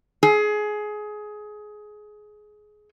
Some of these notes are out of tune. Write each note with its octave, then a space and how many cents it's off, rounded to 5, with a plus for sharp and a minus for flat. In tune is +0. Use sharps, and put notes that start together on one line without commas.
G#4 +20